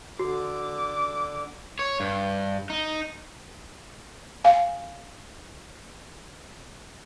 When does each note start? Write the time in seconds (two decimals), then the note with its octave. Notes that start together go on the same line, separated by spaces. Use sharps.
0.19 D3 F#4 D6
1.79 C#5
2.00 G2
2.70 D#4
4.44 F5 G#5